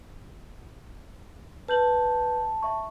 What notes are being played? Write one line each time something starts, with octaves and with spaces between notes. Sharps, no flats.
B4 A5 G6 F#7
E5 C#6